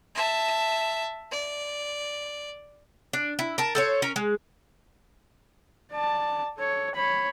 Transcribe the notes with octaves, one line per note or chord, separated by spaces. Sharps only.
E5 A5
D5
D4
E4
A#4 A5
A4 C5 C#5
C#4 A#4
G#3
D5 A5
A4 C#5
C#5 B5